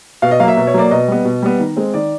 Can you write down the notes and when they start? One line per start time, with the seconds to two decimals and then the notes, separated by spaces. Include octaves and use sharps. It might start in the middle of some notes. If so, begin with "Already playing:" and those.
0.22 B2 F5
0.31 D#5
0.40 F#3 A#3 F5
0.48 E5
0.57 B2
0.67 C#5
0.74 F#3 A#3 D5
0.91 B2 D#5
1.08 G3 B3
1.25 B2
1.42 G3 B3
1.60 D#3
1.76 G#3 C4
1.94 D#3 D5